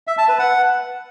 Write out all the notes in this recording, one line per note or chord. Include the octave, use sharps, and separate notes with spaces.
E5
A5
B4
F#5